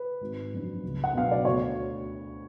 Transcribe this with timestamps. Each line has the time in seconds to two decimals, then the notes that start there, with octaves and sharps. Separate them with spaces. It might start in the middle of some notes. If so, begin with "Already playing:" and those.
Already playing: B4
0.21 G#1
0.52 F#2 F3 B3 D4
0.83 C#2
1.04 F#5
1.14 B2 F#3 B3 D4 F5
1.31 D5
1.45 D2 C#5